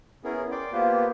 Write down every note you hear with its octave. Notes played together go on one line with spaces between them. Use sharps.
B3 C#4 E4 G#4 A#4
D5 G5 C6 D6
A#3 B3 F4 G4 B4 C5